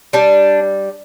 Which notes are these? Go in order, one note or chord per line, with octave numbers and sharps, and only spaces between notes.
G3 D4